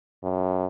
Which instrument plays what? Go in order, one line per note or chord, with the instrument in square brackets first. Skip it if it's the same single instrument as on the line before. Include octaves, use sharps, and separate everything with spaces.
[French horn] F#2